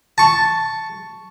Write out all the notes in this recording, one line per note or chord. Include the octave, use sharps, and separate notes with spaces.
A5 C#6